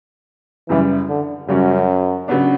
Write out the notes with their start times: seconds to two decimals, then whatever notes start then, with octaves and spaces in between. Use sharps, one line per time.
0.69 F#2 C#3 E3 G3
1.08 D3
1.48 F#2 C#3 G3 C#4 F#4
2.28 C#3 F#3 B3 D4